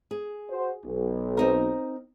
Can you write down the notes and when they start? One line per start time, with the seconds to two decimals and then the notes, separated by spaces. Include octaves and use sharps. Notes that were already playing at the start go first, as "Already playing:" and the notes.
0.11 G#4
0.50 F#4 C5
0.85 B1
1.37 C4 D#4 A#4